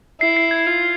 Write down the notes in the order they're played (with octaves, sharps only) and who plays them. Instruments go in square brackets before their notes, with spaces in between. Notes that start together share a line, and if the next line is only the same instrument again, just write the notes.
[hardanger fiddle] E4 [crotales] C7
[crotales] C7
G#6
[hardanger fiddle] F4